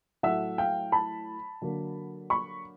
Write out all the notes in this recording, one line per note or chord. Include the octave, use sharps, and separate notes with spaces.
A2 F#3 A3 E5 F#5
F5 G5
A5 B5
D3 F#3 A#3
B5 C#6